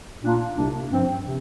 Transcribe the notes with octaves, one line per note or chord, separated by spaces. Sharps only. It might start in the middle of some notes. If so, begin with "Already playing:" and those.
A#2 A#3 D4 F4
C2 C3 A#3 D4
G2 F3 C4
C3